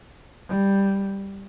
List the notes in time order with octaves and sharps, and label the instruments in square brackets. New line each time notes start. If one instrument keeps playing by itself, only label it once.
[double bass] G3